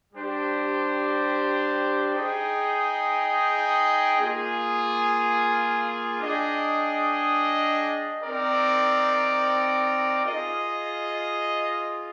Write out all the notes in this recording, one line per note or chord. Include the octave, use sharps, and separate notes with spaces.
G3 D4 G4 C5
D#4 G#4 D#5 G5
A#3 F4 G#4
D4 G#4 D#5 G5
C4 D#4 A#4 D5
F4 G#4 D#5